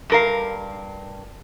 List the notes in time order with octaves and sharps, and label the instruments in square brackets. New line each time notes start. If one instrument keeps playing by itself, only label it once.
[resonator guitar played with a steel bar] G2 A#4 F5